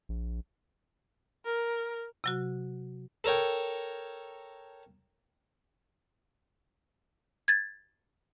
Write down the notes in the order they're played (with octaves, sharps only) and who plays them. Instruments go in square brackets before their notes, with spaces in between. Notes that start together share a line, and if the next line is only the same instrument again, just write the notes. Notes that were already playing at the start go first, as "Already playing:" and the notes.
[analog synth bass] A#1
[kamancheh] A#4
[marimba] C3 F#3 F#4
[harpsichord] A4 A#4 C#5 G5
[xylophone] G#6 A6